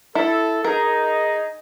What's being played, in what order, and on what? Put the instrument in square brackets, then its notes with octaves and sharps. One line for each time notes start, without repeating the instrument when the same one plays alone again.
[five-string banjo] E4 [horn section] A4
[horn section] D#4 G#4 [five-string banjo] A#4